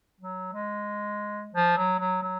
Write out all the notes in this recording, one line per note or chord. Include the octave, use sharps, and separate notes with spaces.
F#3
G#3
F3
F#3
F#3
F#3